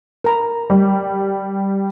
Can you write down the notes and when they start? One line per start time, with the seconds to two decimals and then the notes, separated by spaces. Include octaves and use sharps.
0.24 A#4 A#5 B5
0.70 G3